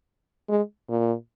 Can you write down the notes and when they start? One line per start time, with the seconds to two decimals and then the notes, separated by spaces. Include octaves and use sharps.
0.48 G#3
0.89 A#2